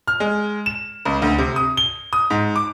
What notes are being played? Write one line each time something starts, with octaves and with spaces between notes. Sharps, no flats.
F6
G#3
E7
C#2
D2
C3
D#6
G7
D#6
G#2
D6